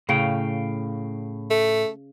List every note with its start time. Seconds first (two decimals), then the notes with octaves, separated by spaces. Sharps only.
0.09 A2 C#3 F5 G5
1.51 A3